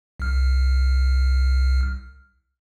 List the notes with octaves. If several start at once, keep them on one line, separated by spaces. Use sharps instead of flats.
C2 F6